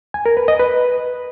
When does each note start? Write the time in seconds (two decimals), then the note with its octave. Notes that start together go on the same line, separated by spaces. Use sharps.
0.14 G#5
0.26 A#4
0.37 B4
0.48 D#5
0.59 B4